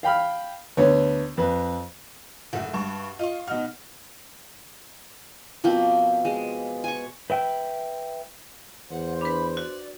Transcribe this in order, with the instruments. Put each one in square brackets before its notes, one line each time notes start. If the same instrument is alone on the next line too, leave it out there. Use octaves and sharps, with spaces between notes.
[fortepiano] F5 G5 B5 F6
D2 B3 C#5
F2 B4
[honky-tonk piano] F#1 A3 [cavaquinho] F#4 E5
[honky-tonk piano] G2 A5 C#6
[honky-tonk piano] F4 [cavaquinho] D#5 C#6
[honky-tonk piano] B2 D#4 F6 [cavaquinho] F#4
[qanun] B2 F3 A#3 C4
G#3
G#5 C#6
[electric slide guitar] B4 E5 G5
[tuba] E2 [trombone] C5 [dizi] F#5
[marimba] D4 B4 [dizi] B5
[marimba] F#4 [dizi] D5